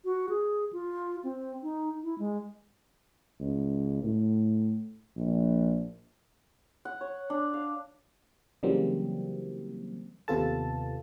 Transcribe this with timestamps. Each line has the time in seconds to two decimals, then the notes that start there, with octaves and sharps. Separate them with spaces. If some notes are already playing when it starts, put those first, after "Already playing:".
0.05 F#4
0.29 G#4
0.73 F4
1.24 C4
1.63 D#4
2.03 E4
2.19 G#3
3.40 C#2
4.03 A2
5.17 A#1
6.85 F#5
7.01 C#5
7.30 D4
7.54 F5
8.63 C#3 E3 F#3 G3 A#3 C4
10.28 D#2 C3 B3 F4 A4 A5